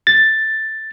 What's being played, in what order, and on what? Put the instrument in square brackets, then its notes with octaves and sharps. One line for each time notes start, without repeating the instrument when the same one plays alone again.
[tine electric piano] A6